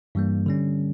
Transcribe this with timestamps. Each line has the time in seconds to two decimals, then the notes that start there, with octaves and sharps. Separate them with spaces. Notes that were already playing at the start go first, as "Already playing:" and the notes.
0.15 G2 E3 G3 A#3
0.46 D3 G3 C#4